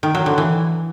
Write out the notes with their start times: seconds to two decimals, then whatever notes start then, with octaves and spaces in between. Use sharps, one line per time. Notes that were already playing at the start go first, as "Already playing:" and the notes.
0.03 D#3
0.15 F#3
0.26 D3
0.38 E3